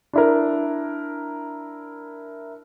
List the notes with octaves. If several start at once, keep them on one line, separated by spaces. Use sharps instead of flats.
D4 E4 A#4